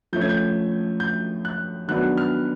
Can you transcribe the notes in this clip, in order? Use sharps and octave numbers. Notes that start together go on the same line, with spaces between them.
F3 A3 C#4 G6
G#6
G6
G6
F#6
D#3 F#3 B3 D4 F#6
F6